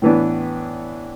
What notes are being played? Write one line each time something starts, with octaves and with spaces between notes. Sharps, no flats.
A2 E3 B3 D4